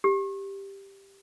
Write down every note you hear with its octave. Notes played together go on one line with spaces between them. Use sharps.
G4